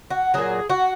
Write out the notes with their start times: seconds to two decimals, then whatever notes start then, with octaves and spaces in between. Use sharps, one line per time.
0.10 F#4
0.34 A#2 F#3 G#4
0.70 F#4